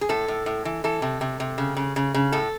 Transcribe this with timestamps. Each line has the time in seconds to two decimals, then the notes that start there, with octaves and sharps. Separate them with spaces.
0.01 G#4
0.09 A2 A4
0.28 A2
0.46 A2
0.65 E3
0.84 E3 A4
1.02 C3
1.21 C3
1.40 C3
1.58 C#3
1.77 C#3
1.96 C#3
2.14 C#3
2.32 A2 A4